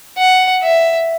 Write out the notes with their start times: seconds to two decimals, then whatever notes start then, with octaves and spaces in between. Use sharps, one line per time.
0.18 F#5
0.63 E5